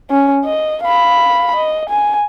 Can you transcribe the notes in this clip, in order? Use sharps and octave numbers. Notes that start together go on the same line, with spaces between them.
C#4
D#5
F5 B5
D#5
G#5